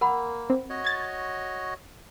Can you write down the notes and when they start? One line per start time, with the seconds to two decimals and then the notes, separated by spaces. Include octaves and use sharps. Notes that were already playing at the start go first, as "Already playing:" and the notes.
0.01 A#3 A#4 F#5 B5
0.50 C4
0.70 F#4 C#5 D#5
0.85 G#6 A6